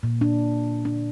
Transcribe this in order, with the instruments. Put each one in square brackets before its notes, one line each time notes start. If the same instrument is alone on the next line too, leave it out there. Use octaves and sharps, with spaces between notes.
[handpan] A#2
D4
D4